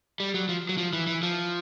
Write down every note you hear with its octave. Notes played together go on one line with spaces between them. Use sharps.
G3
F#3
F3
F#3
F3
E3
E3
F3